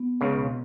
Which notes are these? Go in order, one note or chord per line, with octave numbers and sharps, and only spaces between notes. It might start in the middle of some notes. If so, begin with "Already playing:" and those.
Already playing: B3
C#2 C#3
B2